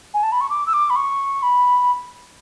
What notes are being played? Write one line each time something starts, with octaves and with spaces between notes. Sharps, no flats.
G#5
A5
B5
C#6
D6
E6
D6
B5
C#6
B5